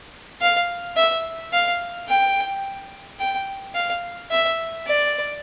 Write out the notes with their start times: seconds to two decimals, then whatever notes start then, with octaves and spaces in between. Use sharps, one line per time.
0.41 F5
0.96 E5
1.53 F5
2.08 G5
3.20 G5
3.75 F5
4.31 E5
4.87 D5